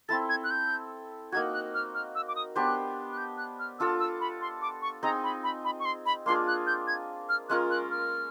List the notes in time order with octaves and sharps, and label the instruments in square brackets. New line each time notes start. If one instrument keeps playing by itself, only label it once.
[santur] C4 E4 A4 [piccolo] A6
[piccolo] G#6
F#6
G6
[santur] A#3 D#4 F#4 [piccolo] G#6
[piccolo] F#6
F6
F6
E6
D6
D#6
[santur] B3 D4 G4 C5 [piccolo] F#6
[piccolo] F#6
G6
F#6
F6
[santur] D4 F4 A4 [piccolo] E6
[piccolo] E6
B5
C6
D6
C#6
[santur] C4 D#4 G#4 [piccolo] A#5
[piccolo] B5
B5
B5
C#6
C6
B5
[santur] A#3 D4 F4 G#4 [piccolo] C6
[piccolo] F#6
G6
G#6
F6
[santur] G#3 C#4 F4 A#4 [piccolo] F#6
[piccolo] F#6
F6